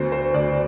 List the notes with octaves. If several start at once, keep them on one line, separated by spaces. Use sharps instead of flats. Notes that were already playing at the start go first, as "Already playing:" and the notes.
Already playing: D2 B3 C5
C5
D2 D5